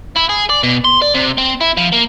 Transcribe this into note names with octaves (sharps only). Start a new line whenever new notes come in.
E4
G#4
D5
B2
C6
D5
C3
C4
E4
F3
A#3